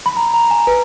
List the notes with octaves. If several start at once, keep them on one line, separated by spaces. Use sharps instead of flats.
B5
A#5
A#5
G#5
B4